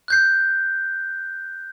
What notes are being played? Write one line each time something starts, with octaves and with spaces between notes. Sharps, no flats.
F#6 G6 C7